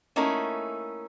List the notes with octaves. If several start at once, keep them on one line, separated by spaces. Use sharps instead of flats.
A3 A#3 C#4 D#4 E4 A4